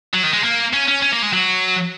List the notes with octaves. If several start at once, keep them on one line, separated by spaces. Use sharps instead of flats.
F#3
D#3
G#3
A#3
C#4
C#4
C#4
A#3
G#3
F#3